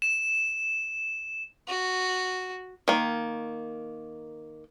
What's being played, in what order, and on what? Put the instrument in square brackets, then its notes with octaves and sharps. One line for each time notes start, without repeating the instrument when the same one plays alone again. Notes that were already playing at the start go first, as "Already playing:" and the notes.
[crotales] E7
[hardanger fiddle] F#4
[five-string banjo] D#3 A#3